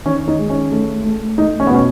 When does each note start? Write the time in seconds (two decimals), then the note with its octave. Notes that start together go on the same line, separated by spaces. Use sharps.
0.06 D#3 C#4
0.28 D#4
0.39 G#3
0.50 C#4
0.72 A3
1.05 A3
1.38 A3 D#4
1.60 C#4
1.67 B3
1.71 B2 C#4